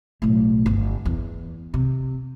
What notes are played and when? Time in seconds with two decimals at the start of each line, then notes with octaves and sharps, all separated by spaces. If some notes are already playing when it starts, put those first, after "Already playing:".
0.22 B1 A2
0.66 G1
1.05 E2
1.74 C3